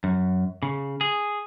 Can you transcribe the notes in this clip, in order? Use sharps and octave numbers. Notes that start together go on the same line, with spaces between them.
F#2
C#3
G#4